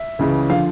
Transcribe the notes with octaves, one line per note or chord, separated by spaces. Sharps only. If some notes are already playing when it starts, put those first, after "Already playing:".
Already playing: E5
C#2 C#3 E3
D3 F3 F5